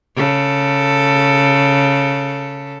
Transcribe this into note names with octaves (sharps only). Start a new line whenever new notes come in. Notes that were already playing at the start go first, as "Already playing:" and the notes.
C#3 A4